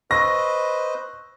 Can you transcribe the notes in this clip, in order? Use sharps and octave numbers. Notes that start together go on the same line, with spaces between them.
B4 C5 D#5 C#6 E6 A#6